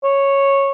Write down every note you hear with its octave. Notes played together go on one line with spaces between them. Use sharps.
C#5